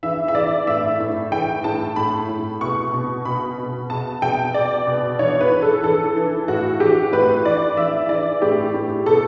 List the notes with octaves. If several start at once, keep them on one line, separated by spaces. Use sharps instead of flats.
E3 E5
E5
E3 D5
A2 E5
A2
E3 G5
A2 A5
A2 B5
A2
B2 C#6
B2
B2 B5
B2
B2 A5
B2 G5
B2 D5
B2
E3 C#5
B4
E3
A4
E3 A4
E3
A2 F#4
E3 G4
A2 B4
E3 D5
E3 E5
E3 D5
A2 G4
A2
B2 A4